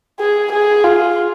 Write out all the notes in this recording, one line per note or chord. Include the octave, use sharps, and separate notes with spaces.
G#4
G#4
F4